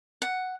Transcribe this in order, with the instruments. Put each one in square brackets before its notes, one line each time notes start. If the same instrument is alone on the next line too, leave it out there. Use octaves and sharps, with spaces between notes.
[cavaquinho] F#5